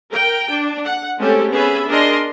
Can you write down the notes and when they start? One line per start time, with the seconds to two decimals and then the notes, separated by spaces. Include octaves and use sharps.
0.12 A#4 G5
0.50 D4
0.85 F#5
1.18 G#3 A3 C4 C#4 G4 A4
1.52 B3 C#4 G#4 B4 E5 B5
1.88 D4 G#4 A#4 D#5 C6